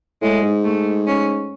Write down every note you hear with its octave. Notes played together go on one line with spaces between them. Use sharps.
A2 G#3
G#2
A3
C#4